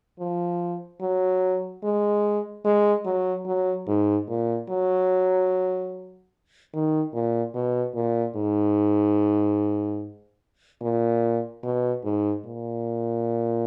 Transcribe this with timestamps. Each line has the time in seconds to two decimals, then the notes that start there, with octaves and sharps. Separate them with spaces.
0.20 F3
1.01 F#3
1.84 G#3
2.65 G#3
3.06 F#3
3.46 F#3
3.88 G#2
4.28 A#2
4.69 F#3
6.74 D#3
7.14 A#2
7.54 B2
7.95 A#2
8.36 G#2
10.82 A#2
11.63 B2
12.04 G#2
12.45 A#2